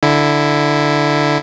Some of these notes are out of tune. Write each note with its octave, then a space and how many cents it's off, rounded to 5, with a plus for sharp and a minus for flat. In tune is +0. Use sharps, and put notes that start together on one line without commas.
D3 +0 E4 +0